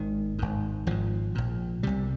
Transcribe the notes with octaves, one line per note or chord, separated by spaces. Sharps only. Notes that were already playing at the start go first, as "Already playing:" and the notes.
Already playing: G#1 G#2 D#3
G#1 G#2
G#1 G#2 F3
A#1 A#2
C2 C3 G3